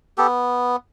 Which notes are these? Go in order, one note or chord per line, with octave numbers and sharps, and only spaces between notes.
B3 G4 A4